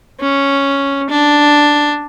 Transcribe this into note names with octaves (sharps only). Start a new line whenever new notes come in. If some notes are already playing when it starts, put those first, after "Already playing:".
C#4
D4